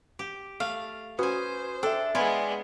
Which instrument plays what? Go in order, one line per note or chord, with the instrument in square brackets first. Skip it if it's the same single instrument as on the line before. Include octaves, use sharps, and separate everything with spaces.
[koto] G4
[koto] A3 [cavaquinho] F5
[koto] C#4 G#5 [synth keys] F#4 B4 D#6 [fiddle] C5
[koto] D4 [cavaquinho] A4 [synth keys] E5 G5
[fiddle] G#3 B3 [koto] E4 F4 [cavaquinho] D5 G#5 C6